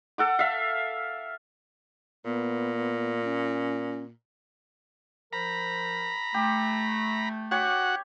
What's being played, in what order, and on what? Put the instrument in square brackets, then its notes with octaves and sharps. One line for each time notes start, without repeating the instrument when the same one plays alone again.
[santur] A4 F#5 D6
E5 F5
[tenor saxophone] A#2 [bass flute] B3
[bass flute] C#4
[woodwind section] F3 A#4 C5 [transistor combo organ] A#5 B5
[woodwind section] A3 [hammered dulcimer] G4
[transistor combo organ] F#4 F#5 [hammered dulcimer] G4 C#5